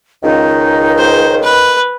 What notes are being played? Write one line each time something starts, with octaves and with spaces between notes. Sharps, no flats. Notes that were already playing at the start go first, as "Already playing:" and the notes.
C#2 D#3 D#4
C5
B4